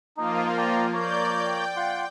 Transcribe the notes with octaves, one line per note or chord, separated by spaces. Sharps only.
F3 A#3 D#4 F4
D5 G5 A#5
A#3 C#5 D5 A#5 G6
G5
F4 F#5 C6